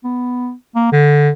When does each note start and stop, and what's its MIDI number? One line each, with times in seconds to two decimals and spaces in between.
0.04 0.53 59
0.76 0.91 58
0.93 1.30 50